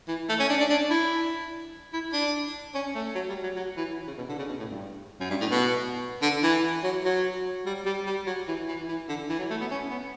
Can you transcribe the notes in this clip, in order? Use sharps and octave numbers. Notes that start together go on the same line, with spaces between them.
E3
A3
C#4
D4
D4
D4
E4
E4
D4
C#4
A3
F#3
G3
F#3
F#3
E3
C#3
B2
D3
C#3
B2
A2
G2
F#2
G2
A2
B2
D3
E3
F#3
F#3
G3
G3
G3
F#3
E3
E3
E3
D3
E3
F#3
A3
B3
C#4
B3